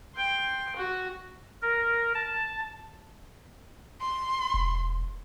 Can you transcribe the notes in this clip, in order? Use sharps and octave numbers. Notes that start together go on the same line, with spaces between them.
G5 C6
F#4
A#4
A5
C6
E1